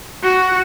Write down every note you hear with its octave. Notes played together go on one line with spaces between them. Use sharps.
F#4